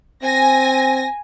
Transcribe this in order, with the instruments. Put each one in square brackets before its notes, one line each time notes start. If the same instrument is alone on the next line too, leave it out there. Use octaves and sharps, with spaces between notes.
[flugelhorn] C4 [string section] G#5 A#6